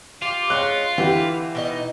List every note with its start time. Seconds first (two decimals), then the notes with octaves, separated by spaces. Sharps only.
0.22 F4 G4
0.50 G#3 C#4 F#6
0.98 D3 E3 G4 B4
1.55 B2 D#4 D#5